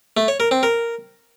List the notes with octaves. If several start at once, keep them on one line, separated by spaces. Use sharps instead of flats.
A3
C#5
A#4
C4
A#4